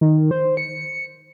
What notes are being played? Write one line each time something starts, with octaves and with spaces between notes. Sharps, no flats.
D#3
C5
C#7